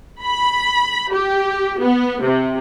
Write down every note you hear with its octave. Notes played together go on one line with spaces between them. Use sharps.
B5
G4
B3
C3